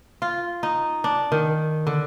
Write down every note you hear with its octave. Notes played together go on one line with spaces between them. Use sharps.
F4
D#4
D4
D#3
D3